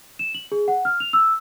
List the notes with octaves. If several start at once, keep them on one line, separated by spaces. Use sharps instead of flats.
E7
F#7
G#4
F#5
F6
F7
E6